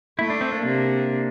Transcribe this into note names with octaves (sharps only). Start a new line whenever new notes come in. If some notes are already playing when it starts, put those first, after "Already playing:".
A3 E4
D4
C4
A#3 D4
C3